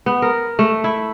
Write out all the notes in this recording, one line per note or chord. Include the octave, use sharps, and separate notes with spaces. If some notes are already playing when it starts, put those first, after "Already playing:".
B3
A#4
A3
E4